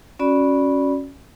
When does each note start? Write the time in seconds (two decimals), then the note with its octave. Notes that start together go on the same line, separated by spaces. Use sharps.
0.19 C#4 F#4 D5 B5